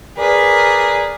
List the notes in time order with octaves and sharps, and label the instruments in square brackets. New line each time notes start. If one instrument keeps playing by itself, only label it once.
[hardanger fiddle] G#4 B4 [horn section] A#4 D5